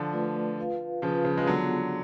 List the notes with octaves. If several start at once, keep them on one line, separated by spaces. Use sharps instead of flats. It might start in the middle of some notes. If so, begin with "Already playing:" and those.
Already playing: D3 F3
A3 F4 B4 D5
F4 B4 F5
C#3 F3 F4 B4 F5
C#3 F3
G#3
D3 F#3 B3 F4 G#4